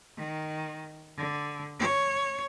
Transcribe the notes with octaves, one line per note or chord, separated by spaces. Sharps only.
D#3
D3
C#5